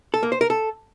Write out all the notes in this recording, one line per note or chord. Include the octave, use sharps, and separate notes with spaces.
A4
A#3
C5
A#4
A4